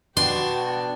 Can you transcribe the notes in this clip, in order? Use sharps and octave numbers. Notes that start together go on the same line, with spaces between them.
B2 D4 F#4 G5 C6